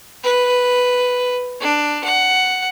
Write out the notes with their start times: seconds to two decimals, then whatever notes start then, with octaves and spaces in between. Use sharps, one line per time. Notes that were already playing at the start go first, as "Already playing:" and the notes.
0.23 B4
1.60 D4
2.04 F#5